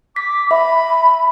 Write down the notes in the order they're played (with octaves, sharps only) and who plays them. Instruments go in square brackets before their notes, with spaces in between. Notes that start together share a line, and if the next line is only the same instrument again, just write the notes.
[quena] D6 [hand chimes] B6
[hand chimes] E5 [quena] B5